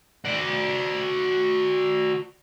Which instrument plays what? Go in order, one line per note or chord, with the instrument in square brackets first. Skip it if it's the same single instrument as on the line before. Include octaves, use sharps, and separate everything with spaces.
[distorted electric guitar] F#4 D5